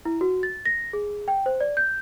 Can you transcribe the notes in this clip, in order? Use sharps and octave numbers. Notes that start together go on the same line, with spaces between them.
E4
F#4
A6
A#6
G#4
G5
C5
D5
G6